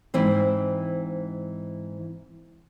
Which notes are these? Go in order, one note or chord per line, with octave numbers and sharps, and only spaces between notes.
G#2 E3 C4 C5